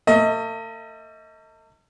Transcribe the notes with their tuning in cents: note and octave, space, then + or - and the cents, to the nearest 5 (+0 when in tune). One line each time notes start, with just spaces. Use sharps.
A3 +45 D#5 +35